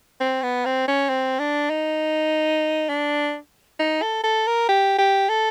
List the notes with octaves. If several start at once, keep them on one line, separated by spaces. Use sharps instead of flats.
C4
B3
C4
C#4
C4
D4
D#4
D4
D#4
A4
A4
A#4
G4
G4
A4